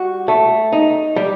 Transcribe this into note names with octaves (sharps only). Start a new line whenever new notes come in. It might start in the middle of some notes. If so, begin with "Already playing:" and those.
Already playing: G3 F#4
A3
D#4
G3